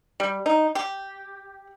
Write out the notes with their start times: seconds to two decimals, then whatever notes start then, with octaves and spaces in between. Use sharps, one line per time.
0.20 G3
0.46 D#4
0.75 G4